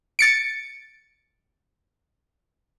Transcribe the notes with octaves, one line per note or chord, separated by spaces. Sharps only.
A6 C#7 D7